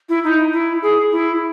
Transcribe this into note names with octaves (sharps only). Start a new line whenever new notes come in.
E4
D#4
E4
G#4
E4